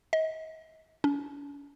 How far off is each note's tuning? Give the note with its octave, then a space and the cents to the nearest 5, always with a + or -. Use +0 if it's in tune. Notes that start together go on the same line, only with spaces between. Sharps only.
D#5 +35
C#4 +45